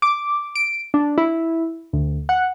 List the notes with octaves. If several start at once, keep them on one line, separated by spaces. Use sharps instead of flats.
D6
D7
D4
E4
D2
F#5